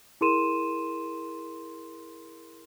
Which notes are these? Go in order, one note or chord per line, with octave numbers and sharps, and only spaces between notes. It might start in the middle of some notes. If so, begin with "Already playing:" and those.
E4 G#4 A#4 C6 D#7 E7